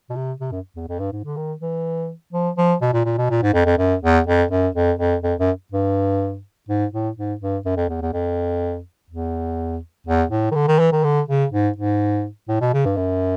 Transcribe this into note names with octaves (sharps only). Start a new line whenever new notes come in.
B2
C3
C3
F#2
E2
F2
G2
G#2
D3
D#3
E3
F3
F3
B2
A#2
A#2
B2
A#2
G#2
F2
F2
F#2
E2
F2
F#2
F2
F2
F2
F#2
G2
G#2
A2
G#2
G2
F#2
F2
E2
E2
F2
E2
E2
A2
D#3
D3
D#3
E3
D#3
D3
C#3
G#2
G#2
A2
B2
C#3
G2
F#2